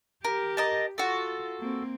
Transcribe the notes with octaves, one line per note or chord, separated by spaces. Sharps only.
G4 A#4
A#4 D#5 A5
F4 F#4 A4
A#3 C4